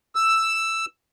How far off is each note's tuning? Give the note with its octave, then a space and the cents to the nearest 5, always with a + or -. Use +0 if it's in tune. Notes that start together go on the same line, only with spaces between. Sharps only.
E6 +5